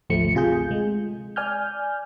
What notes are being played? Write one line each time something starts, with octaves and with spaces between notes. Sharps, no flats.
G#1 D2 F3 A3 C#7
C3 F4 G#4 G6
G#3
D5 G#5 F6 G6